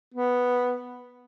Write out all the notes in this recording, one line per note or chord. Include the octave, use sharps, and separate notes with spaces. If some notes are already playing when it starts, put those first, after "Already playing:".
B3